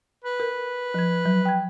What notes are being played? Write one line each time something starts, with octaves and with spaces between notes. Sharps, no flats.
B4
A#4
F3 G#6
F#3
G5 G#6